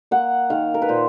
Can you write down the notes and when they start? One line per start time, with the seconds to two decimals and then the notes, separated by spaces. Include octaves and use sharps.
0.11 A#3 F#5
0.50 D#3 F5
0.74 A#4
0.82 B4
0.89 A#2 C5